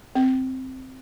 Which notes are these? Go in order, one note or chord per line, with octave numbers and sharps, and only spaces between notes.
C4